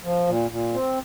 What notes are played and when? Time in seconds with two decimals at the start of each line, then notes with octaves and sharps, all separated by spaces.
0.05 F3
0.27 A#2
0.51 A#2
0.73 C4